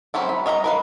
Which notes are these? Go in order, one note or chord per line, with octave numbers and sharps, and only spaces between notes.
F#3 C4 C#4 E4
B5
C#5 D#5 F5 A#5
A#4 B4 F5